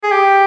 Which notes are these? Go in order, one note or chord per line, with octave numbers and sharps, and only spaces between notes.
G#4
G4